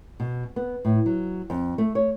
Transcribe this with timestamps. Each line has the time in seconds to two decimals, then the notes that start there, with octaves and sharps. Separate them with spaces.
0.20 B2
0.56 B3
0.85 A2
1.06 F#3
1.50 F2
1.78 A3
1.95 C#5